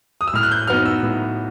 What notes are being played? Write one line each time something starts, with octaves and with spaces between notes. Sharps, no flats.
D#6
E6
A2 F6
F#6
G6
F#3 B3 D#4 F6
E6
A2